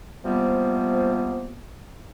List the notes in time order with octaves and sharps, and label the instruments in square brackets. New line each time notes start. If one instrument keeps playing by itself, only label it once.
[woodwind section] C3 F3 G3 A#3 B3